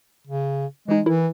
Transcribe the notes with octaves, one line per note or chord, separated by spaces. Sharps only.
C#3
E3 G#3 D#4
E3 E4 A#4